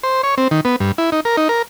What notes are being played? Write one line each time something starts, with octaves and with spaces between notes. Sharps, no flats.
C5
C#5
C4
D#3
B3
G2
E4
D#4
A#4
D#4
A#4